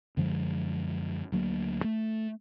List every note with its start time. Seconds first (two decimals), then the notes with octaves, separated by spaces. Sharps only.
0.17 F#2 D3 F3 G#3
1.32 D2 F#3 A#3
1.84 A3